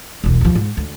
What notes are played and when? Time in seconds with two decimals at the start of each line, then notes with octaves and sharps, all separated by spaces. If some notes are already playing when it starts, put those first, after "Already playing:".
0.24 E1 C2
0.41 D#2 F3
0.55 G#2
0.77 D2